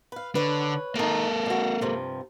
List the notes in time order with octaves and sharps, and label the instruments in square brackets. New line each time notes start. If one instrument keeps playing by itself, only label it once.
[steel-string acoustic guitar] B4 F5
[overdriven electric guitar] D3 [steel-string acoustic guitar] B4 C#5
[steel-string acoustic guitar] A2 D#3 [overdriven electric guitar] A#3 A4
[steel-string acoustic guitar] D3 F#4
G2 C3 F3